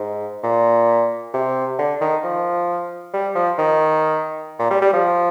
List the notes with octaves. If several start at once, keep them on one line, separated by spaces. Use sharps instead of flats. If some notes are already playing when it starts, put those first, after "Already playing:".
Already playing: G#2
A#2
C3
D3
D#3
F3
G3
F3
D#3
A#2
G3
G3
F3